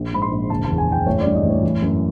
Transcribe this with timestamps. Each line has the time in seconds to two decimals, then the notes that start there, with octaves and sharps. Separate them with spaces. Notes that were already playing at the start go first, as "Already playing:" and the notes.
Already playing: A#1
0.13 G#2 B5
0.22 C6
0.31 A#1
0.50 F#1 A5
0.64 E2 A5
0.78 G#5
0.88 F#1 G5
1.06 A1 C#5
1.21 G2 D5
1.35 D#5
1.44 A1
1.50 C#5
1.63 E3
1.82 F#2